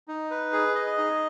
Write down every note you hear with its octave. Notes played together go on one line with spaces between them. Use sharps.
D#4
B4
G#4
D#5
D#4